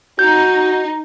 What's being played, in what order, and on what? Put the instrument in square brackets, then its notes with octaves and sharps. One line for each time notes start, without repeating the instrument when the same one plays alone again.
[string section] D#4 [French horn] F#4 [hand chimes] G6